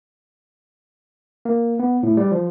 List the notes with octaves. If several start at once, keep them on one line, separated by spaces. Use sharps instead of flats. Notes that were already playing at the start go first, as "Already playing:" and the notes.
A#3
B3
A2
G3
F3